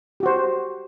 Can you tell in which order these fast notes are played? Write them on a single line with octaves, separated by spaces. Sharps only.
G4 F#4 C5